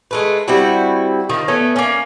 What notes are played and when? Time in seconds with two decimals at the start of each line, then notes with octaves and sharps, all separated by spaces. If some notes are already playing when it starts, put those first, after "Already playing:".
0.11 G#3 A3 B4
0.48 G3 C4 E4 F#4
1.30 D#3 F3
1.48 A3 B3 C#4
1.76 A#3 C#4